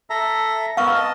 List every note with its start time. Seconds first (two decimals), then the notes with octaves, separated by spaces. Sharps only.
0.10 A4 E5 A#5
0.77 B3 A#4 F5 C#6 E6
0.94 D#5 A5